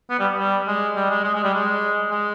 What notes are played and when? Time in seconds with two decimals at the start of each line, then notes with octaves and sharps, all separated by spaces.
0.10 B3
0.19 G3
0.37 G3
0.67 G#3
0.96 G3
1.10 G#3
1.24 G#3
1.35 G#3
1.44 G3
1.54 G#3
2.10 G#3